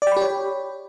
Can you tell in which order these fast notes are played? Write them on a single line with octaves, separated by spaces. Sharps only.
D5 G5 B5 G4 C#5